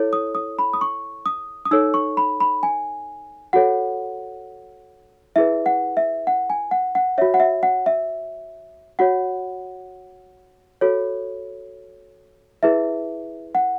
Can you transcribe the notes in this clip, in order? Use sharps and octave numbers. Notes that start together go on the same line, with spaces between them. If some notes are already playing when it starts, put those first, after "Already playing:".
Already playing: E4 A4 C#5
D#6
D#6
B5
D#6
C#6
D#6
D#6
D#4 A4 C#5 E6
C#6
B5
B5
G#5
F#4 A4 C#5 F#5
E4 G#4 B4 E5
F#5
E5
F#5
G#5
F#5
F#5
F#4 C#5 E5
F#5
E5
F#5
E5
F#4 C#5 F#5
F#4 A4 C#5
E4 G#4 B4 E5
F#5